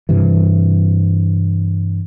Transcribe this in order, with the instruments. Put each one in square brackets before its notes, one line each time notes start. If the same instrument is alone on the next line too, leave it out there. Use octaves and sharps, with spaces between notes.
[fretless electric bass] G2 C3 E3